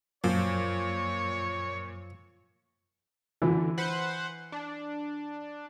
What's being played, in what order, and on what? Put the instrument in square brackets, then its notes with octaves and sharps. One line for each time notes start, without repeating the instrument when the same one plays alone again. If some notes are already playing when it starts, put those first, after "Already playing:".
[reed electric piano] F#2 [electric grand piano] A#2 [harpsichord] F3 [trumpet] C#5
[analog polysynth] D3 [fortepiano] E3
[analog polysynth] B4 C5 F#5
D4